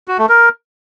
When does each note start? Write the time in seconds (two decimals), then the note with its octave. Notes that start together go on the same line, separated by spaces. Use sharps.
0.08 F#4
0.19 A3
0.29 A#4